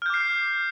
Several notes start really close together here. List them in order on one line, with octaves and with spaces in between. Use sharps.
F6 G6 D6 C7